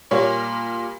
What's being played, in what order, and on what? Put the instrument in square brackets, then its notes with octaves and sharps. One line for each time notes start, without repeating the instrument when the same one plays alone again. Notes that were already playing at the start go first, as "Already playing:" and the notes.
[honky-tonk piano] A#2 G3 A#3 C#5